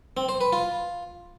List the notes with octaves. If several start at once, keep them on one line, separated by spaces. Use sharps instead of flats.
C4
C5
B4
F4